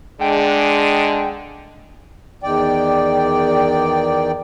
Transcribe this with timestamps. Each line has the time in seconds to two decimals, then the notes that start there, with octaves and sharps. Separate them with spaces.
0.21 D3 G#3 D4 G5
2.43 E2 D#3 D5 G5